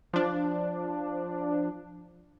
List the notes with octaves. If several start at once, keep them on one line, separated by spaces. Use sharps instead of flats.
F3 D4